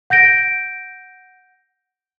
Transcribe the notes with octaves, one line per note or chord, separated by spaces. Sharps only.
F#5 G6 A#6 D7